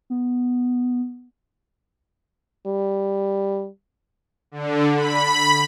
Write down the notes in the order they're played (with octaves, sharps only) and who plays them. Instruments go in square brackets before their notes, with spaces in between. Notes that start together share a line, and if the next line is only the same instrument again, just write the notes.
[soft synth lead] B3
[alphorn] G3
[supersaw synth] D3
B5